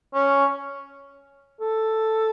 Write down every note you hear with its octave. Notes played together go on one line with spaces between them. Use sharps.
C#4
A4